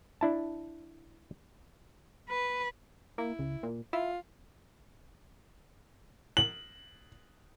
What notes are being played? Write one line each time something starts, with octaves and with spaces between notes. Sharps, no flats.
D4 E4 A5
B4
A#3 E4
C#2
A#2
E4 F4
F#7